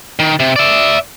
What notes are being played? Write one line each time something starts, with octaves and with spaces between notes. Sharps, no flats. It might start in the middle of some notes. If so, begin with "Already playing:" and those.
D#3
C3
D5 E5